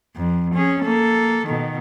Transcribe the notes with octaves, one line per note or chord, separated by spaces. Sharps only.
F2
C#4 G#4
A#3 A4
B2 D#3